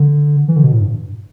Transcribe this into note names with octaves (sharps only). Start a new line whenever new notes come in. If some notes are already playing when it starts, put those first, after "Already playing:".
Already playing: D3
E3
D3
B2
A2
G2